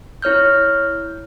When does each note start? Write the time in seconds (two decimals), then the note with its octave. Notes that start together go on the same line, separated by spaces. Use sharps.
0.22 E4 C#5 F6 G6